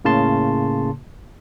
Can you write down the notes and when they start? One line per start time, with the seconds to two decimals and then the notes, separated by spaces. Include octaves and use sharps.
0.05 A2 C#3 A#3 A5 C6